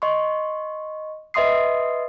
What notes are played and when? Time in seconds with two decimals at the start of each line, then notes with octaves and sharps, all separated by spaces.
0.02 D#5 C6 C#6
1.34 B4 D#5 E5 C6 D#6 C7